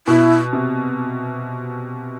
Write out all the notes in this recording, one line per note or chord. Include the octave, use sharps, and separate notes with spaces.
B2 E4
C3